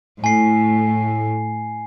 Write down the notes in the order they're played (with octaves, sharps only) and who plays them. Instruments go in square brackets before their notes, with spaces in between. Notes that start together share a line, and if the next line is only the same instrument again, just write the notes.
[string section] A2 [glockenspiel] G#5 C7